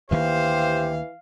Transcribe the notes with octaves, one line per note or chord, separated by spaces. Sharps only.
D2 D#3 E3 A#3 G4 C5 F5